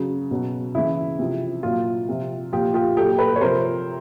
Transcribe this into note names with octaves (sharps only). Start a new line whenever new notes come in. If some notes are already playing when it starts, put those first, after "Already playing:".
Already playing: C#3 F#3
B2 F#3
C#3 E3 E4
C3 F3
A#2 F#3 F4
C3 F3
A#2 F3 F4 G4
F4 G4
A#2 F#3 G4 A4
A4 B4
C#5
C3 F3 A#4 C5